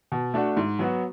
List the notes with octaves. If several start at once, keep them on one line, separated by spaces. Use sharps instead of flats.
B2
A3 D4 F#4
G#2
F#3 B3 F#4